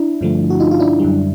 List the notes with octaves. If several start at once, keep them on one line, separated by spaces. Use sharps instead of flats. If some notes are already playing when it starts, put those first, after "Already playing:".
Already playing: D4 E4
G2 D3 F3 A3
F#4
D#4 F4
F4
D4 E4
F#2 D3 G3